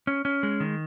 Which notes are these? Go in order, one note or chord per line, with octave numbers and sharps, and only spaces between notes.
C#4
C#4
G#3
D#3